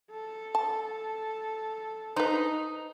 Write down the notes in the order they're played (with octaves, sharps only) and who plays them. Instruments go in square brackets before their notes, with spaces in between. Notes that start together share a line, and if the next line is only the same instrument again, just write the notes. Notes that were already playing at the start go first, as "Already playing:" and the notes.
[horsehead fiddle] A4
[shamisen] A5
[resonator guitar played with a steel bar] D#4 [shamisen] B4 C5